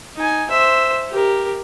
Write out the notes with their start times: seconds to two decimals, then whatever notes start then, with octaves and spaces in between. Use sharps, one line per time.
0.16 D#4 G#5
0.50 C5 E5
1.10 G4 A#4